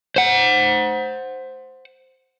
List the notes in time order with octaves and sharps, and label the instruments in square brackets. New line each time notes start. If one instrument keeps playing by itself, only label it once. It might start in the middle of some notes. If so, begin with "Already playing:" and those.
[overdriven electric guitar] C5 F#5